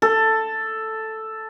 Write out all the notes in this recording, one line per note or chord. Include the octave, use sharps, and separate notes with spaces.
A4